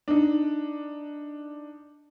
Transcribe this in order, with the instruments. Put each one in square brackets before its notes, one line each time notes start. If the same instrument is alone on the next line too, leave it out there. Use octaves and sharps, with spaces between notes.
[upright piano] D4 D#4